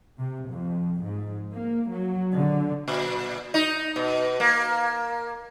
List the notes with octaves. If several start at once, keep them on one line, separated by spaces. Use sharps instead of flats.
C3
F2
G#2
A#3
F#3
D3
A#2
D#4
B2
A#3